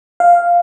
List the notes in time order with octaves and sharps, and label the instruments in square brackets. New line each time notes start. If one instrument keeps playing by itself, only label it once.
[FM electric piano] F5